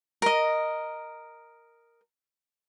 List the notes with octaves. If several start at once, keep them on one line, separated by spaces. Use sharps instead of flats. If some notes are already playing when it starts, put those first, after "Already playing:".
A#4 D#5